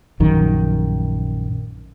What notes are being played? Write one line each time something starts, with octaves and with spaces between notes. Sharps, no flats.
A#1 F#2 D#3